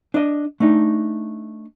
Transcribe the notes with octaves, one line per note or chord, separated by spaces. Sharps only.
D4 D#5
A3 D4 D#4